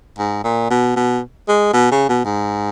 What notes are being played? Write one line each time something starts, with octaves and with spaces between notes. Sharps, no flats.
G#2
A#2
B2
B2
G#3
B2
C#3
B2
G#2